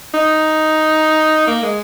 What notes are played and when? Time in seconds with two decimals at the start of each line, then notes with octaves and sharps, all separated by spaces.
0.14 D#4
1.47 A#3
1.63 G#3